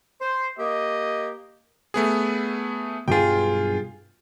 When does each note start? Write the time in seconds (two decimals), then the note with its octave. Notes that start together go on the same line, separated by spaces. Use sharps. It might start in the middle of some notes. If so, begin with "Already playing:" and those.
0.21 C5
0.58 A#3 G4 D#5
1.94 A3 B3 G#4
3.08 B1 G2 F4 G#4 G5